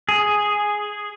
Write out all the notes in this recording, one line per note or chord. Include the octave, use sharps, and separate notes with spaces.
G#4